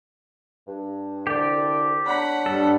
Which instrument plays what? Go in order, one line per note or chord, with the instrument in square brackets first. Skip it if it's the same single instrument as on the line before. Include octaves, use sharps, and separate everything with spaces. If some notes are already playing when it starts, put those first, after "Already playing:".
[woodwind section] G2
[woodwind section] C2 D3 [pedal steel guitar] G4 D5
[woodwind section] D4 C#5 [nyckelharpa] F#5 B5
[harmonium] G2 G3 [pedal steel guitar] A4